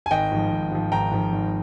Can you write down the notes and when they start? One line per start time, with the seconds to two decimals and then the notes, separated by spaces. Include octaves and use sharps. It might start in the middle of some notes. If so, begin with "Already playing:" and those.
0.06 G#5
0.11 G#1 D#5 G5
0.32 G#2 F3
0.51 G#1
0.71 G#2 F3
0.92 G#1 G5 A#5
1.11 G#2 F3
1.32 G#1